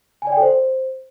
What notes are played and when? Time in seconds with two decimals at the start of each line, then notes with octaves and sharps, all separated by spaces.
0.22 G#5
0.27 D5
0.32 G5
0.37 A4
0.42 C5